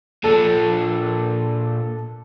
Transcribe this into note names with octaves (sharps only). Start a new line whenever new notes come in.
A#2 D4 A4